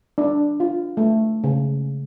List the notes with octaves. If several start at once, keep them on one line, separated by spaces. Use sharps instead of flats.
D4
F4
A3
C#3